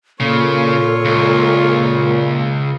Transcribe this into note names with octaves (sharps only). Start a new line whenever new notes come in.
A#2 C#3 F4 A4 C#5
C#2